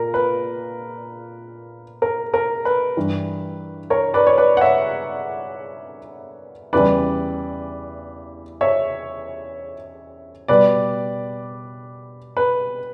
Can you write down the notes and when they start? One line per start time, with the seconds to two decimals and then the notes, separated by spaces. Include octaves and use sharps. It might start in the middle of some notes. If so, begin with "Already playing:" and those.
Already playing: A#2 A#4
0.14 B4
2.02 A#4
2.34 A#4
2.65 B4
2.97 G2 E3 G3
3.90 A#4 C#5
4.14 B4 D5
4.27 C#5
4.38 B4 D5
4.57 F#5
4.61 C#5 E5
6.73 E2 C#3 E3 G3 B4 D5
8.61 C#5 E5
10.48 B2 G3 B4 D5
12.37 B4